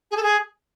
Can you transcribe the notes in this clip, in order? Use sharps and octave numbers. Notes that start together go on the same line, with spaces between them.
G#4
A4
G#4